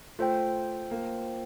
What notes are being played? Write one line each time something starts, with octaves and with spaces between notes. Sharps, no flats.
A3 F4 C5 G5
A#3